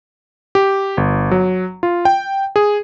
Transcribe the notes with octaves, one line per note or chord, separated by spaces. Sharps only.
G4
G1
F#3
F4
G5
G#4